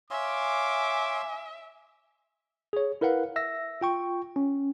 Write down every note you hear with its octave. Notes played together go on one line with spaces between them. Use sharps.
C#5 E5 F5 G#5 C6 D6
G#4 C#5
E4 A#4 B4 F5 F#5
E5 E6 A#6
F4 G5 C#6
C#4